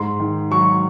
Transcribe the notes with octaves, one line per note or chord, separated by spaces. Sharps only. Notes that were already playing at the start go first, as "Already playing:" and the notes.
Already playing: G#2 C6
D#3
F#3 C#6